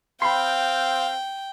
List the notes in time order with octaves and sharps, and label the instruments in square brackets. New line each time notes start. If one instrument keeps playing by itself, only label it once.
[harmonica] C4 F5 [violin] G5 [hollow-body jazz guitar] B5 C6